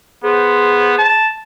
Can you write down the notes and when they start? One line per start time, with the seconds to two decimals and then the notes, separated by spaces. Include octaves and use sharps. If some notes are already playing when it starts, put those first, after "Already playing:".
0.24 B3 G#4 C5
0.99 A5